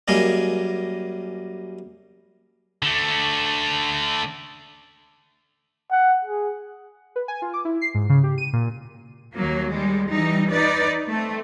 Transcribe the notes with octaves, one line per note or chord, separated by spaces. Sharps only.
F#2 G3 A#3 G#4 D#5
D3 A3
F#5
G#4
B4
G#5
F4
D6
E4
C7
G#2
C#3
G4
D#7
A#2
D#2 F#3 A#3
G3 G#3
E3 G3 D#4
D#4 B4 D5
A3 C4